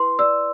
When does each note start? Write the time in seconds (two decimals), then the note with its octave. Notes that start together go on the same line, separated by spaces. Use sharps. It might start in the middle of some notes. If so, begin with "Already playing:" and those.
Already playing: E4 B4 C6
0.19 D5 E6